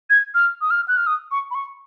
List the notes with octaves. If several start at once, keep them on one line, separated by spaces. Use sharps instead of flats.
G#6
F6
D#6
F6
F#6
F6
D#6
C#6
B5
C#6